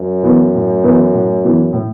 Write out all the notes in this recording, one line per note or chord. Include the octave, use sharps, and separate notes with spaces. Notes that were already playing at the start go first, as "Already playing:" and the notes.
Already playing: F#2
E3 B3
A2
E3 B3
A2
E3 B3
A2